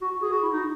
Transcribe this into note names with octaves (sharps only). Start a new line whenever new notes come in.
F#4
F#4
G#4
F#4
E4
D#4